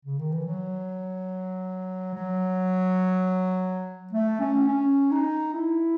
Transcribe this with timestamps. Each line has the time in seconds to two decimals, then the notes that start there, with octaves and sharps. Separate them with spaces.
0.05 C#3
0.18 D#3
0.32 E3
0.46 F#3
2.14 F#3
4.12 A3
4.40 C#4
4.68 C#4
5.11 D#4
5.53 E4